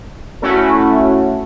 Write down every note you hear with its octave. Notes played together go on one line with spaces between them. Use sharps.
A3 C#4 E4 F#4